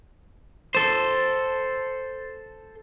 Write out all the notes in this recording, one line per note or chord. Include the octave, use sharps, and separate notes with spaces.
A4 C5